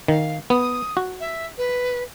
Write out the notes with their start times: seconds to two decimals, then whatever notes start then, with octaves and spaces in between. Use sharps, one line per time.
0.08 D#3 F5
0.50 B3 D#6
0.97 F#4
1.20 E5
1.57 B4